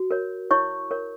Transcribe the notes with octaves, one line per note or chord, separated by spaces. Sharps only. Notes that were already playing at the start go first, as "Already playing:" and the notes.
Already playing: F#4
A#4 C#5
E4 C#5 C#6
A#4 C#5